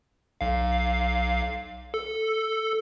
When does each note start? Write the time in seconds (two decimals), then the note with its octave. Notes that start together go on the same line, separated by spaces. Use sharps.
0.41 B1 F5
1.94 A4